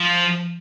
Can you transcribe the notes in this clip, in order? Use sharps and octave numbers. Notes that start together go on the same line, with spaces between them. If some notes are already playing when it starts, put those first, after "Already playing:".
Already playing: F3